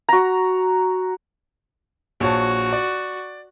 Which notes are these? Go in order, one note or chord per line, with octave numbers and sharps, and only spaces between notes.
F#4 A#5
A#1 F#4 C#5 A5
D5